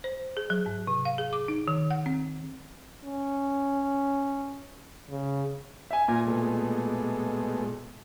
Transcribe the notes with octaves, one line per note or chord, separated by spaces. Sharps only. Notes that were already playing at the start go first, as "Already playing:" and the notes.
C5
G#4
F#3
G#2
C3
F5
G#4
D6
D#4
D#3
F#5
C4
C#4
C#3
E5 G#5
A#2 A#4 G#5
B2 G#3 A3